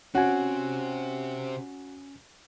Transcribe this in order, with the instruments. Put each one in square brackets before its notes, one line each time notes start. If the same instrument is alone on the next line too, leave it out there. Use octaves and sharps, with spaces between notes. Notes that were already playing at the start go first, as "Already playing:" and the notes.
[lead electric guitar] C3 C4 [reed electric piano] C#4 G#5 [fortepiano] F#4